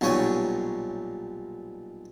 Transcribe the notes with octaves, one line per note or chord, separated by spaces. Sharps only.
B1 A#2 G3 C#5 G5 G#5